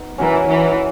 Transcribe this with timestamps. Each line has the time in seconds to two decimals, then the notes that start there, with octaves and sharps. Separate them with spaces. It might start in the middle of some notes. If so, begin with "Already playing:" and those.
Already playing: B3 D#4
0.18 E3 C#4 F#4 A#4
0.48 E3